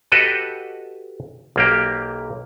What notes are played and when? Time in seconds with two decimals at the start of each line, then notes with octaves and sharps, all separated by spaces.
0.12 F#4 G4 A4 B4 D#5
1.56 B1 A#3 G4